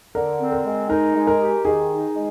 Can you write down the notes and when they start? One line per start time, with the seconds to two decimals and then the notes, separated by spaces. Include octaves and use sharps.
0.15 D3 A#4
0.40 C4
0.52 A#4
0.65 G#3
0.89 D#4 A#4
1.15 G#3
1.27 A#4
1.40 G4
1.65 D#3 G#4
1.89 D#4
2.15 G#3